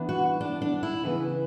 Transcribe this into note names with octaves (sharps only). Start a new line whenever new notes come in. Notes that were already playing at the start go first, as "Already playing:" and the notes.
Already playing: E3 B3 D4
F#4
D4
D4
E4
C#3 E3 B3